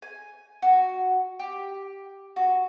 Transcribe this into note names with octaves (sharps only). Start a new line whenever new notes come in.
G#5
F#4
G4
F#4